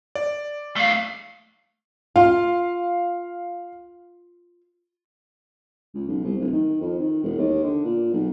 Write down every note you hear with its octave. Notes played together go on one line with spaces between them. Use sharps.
D5
A3 F5
F4 F5
C#2
B1
C2
D1
D#3
F2
D#3
E1
D#2
D3
A#2
B1